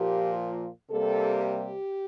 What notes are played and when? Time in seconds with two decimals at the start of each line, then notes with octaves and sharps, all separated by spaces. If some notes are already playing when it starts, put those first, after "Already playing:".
Already playing: A#2 F3 A#3 G4
0.90 C3 G3 A#3 A4
1.43 G4